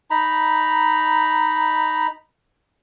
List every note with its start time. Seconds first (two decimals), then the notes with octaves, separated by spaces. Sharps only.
0.11 D#4 A#5 B5